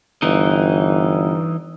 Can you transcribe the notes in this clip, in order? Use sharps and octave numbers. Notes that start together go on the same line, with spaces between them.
G1 E3 D#4